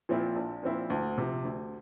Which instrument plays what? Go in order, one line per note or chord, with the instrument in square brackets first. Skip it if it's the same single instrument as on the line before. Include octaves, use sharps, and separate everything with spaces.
[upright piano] A#2 F3 C4 E4
A#1
A#2 F3 C4 E4
D2
C3 F3
D2